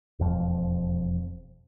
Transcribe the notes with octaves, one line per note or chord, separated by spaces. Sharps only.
E1 F2 F3